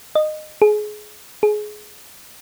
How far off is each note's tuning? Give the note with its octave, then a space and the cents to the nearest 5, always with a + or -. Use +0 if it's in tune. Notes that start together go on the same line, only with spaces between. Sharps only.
D#5 -20
G#4 +25
G#4 +20